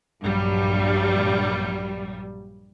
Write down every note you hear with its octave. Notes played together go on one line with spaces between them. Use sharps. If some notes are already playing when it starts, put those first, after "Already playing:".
A#1 G2 F#3 G3